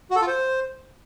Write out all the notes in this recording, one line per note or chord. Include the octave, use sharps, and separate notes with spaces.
F#4
A4
F4
C5